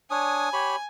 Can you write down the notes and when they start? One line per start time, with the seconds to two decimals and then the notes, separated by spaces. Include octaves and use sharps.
0.11 D4 C#5 G#5 D#6
0.53 G4 C#5 B5